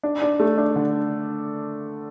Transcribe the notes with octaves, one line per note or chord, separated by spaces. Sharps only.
D4
D4
A3
D4
D3